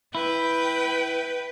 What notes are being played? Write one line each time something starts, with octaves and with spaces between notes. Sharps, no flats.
E4 B4 G5